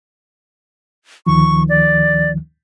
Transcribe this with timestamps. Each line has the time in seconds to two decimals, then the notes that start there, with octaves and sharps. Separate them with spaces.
1.27 D2 D#3 F3 C#6
1.69 D5